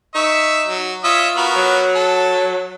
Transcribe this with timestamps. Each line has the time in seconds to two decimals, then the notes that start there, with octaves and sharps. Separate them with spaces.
0.15 D#4 E5 C#6
0.68 F#3
1.04 F4 C#5 D#5 E5
1.37 B3 F#4 A#4
1.56 F#3
1.95 A4